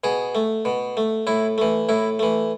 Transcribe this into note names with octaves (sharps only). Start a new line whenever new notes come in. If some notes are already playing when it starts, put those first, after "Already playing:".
B2 G#4
A3
B2
A3
A2 E4
E3 A3
A2 E4
E3 A3